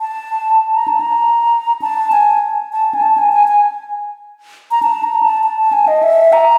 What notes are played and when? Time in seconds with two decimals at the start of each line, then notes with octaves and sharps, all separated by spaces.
0.01 A5
0.75 A#5
0.88 A5
1.01 A#5
1.82 A5
2.12 G#5
2.73 A5
2.95 G#5
3.02 A5
3.18 G#5
3.32 G#5
3.48 G#5
4.71 A#5
4.83 A5
5.03 A#5
5.23 A5
5.44 A5
5.58 A5
5.73 G#5
5.88 D#5
6.03 E5
6.33 A#5